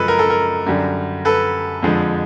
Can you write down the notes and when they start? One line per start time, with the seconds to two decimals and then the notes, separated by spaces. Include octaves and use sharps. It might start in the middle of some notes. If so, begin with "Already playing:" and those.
Already playing: F#2 C#3 F3 G#3 A4 B4
0.08 A#4
0.19 A4
0.30 A#4
0.66 F#2 D3 G3
1.25 A4 B4
1.82 F2 D3 F3 G#3